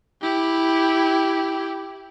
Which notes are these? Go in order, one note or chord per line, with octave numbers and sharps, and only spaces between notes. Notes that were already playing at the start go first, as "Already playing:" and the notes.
E4 G4